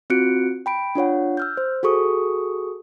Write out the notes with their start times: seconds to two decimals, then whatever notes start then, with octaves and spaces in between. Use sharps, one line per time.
0.10 C4 F4 F#4 F#6 C#7 D7
0.66 G5 B5 D7
0.95 D4 F4 C#5 F#5
1.37 E6 F6 G6
1.57 C5
1.83 F#4 G#4 A4 C#6 D#6